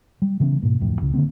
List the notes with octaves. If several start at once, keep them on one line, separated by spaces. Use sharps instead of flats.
G3
C#3 E3 B3 C#4
G#2 B2 A#3
D1 F2 A2
C#2 C#3
D3 F3 A#3 C4